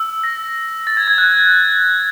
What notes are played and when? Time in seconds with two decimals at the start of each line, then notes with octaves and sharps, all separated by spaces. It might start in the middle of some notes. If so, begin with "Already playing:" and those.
Already playing: E6
0.24 A#6
0.87 A6
0.97 G#6
1.08 G#6
1.18 F#6